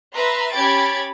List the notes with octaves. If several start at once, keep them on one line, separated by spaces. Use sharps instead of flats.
B4 E5 A#5 C6
C#4 G4 B5 G#6 A6 D7